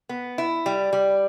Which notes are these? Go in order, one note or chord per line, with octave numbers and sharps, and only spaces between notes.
B3
E4
G3
G3